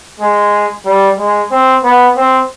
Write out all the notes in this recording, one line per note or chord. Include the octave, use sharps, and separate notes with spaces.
G#3
G3
G#3
C4
B3
C4